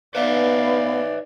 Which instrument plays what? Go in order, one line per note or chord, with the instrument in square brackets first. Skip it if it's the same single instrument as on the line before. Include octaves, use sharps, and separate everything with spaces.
[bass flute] B3 [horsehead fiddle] D#4 D5 [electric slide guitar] B4 C#5 E5 [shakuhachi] F5